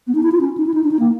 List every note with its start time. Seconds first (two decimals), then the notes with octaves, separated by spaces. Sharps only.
0.07 B3
0.15 D#4
0.23 E4
0.32 F4
0.40 C#4
0.57 D#4
0.67 E4
0.74 D#4
0.84 D4
0.91 D#4
0.99 A#3